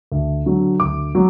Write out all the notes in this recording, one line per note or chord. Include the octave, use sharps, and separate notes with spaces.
D2
D3 F#3
D2 D6
F#3